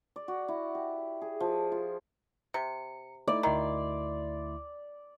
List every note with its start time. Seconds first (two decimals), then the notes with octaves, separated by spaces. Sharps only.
0.16 D5
0.28 F#4
0.48 E4
0.75 G4
1.22 G#4
1.40 F3
1.72 F4
2.54 C3 C#7
3.28 A3 D#4 E4 D5
3.43 D2 D#3 E4 C6